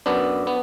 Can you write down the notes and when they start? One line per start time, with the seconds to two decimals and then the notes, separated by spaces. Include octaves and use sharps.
0.06 F#2 B3 D4
0.47 B3